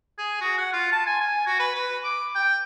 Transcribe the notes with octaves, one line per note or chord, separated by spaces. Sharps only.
G#4
F#4
F#5
F4
A5
G#5
G#5
F#4
B4
B4
D6
G5